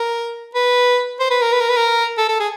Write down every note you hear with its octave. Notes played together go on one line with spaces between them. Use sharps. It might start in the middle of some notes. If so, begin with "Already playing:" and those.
Already playing: A#4
B4
C5
B4
A#4
B4
A#4
B4
A#4
A4
A4
G#4